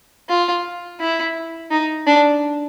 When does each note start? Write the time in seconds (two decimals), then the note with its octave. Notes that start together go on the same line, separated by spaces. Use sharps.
0.29 F4
1.00 E4
1.71 D#4
2.07 D4